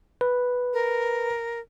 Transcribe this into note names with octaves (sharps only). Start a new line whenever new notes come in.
B4
A#4